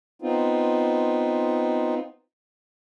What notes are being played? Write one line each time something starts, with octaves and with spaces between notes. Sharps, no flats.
B3 C4 D#4 F4